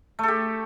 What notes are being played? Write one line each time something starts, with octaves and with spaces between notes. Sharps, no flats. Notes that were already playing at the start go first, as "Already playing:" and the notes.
A3 G4 A4